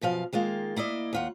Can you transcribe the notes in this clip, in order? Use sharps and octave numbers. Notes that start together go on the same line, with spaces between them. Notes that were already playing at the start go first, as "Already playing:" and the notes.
F#2 B2 F3 F5
D#3 G#3 A#3 F4
A#3 E4 D5 D#5
D#2 F4 F#5